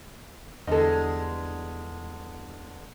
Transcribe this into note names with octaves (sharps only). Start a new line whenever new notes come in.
E2 G2 D3 G#3 A4 D#5